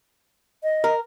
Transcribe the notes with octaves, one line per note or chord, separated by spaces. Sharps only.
D#5
A#4